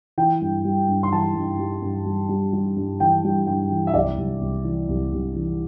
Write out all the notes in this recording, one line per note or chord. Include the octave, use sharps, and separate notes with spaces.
E3 G5
G2
G3
G2
C6
E3 A5
G2
G3
G2
G3
G3
G3
G2
E3 G5
G3
G2 G5
E3
E5
C2 D5
C2
C2
E3
C2
C2
E3